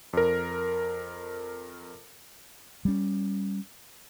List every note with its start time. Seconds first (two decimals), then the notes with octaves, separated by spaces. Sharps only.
0.13 F2 A#4
2.85 G3 C#4